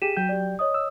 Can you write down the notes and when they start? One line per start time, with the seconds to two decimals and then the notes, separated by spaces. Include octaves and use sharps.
0.02 G4 G#4 B6 D#7 E7
0.17 F#3 G5 G6
0.29 G4 D5
0.59 C#5 D#5 D#6
0.74 E6